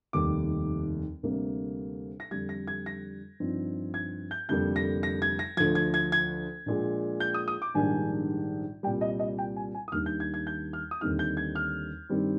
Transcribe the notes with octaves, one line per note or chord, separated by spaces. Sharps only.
F1 D#2 D#3 G3 D6
D2 C3 G3 A#3
A#6
F2 D3 G3 G#6
A#6
G#6
A#6
G2 F3 C4 D#4
G#6
G6
F1 F2 D3 G3 A#3 G6
A#6
A#6
G#6
A#6
D2 D3 F3 G#6
G#6
G#6
G#6
A#1 A#2 G#3
G6
D#6
D#6
D6
A#1 G#2 D#3 G3 D4 G#5
C2 A#2 G3 G5
D#5
D#5
G5
G#5
G#5
D#6
D#2 D#3 G3 A#3 D4 F6
G6
G#6
G#6
G6
F6
D#6
D#2 D3 G3 C4 D#4 F6
G6
G#6
F6
G2 D#3 G3 C4